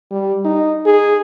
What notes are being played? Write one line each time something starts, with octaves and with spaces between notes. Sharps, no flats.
G3
D#4
G#4